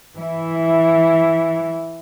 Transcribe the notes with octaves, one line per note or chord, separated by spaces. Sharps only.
E3 E4